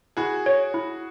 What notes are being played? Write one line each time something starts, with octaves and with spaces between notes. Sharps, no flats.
E4 F#4 G#4
C#5
E4